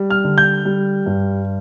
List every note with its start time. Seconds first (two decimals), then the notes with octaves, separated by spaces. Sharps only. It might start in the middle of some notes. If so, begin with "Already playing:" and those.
Already playing: G3
0.10 F6
0.24 D3
0.38 G6
0.65 G3
1.06 G2